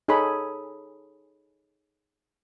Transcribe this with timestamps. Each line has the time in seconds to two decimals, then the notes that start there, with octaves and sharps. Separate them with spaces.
0.08 D#4 G#4 A4 C#5 B5